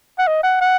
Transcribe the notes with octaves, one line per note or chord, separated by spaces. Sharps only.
F#5
D#5
F#5
F#5